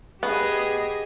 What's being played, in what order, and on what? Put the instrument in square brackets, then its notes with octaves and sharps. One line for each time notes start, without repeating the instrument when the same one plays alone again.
[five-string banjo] B3 [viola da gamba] G4 G#4 D#5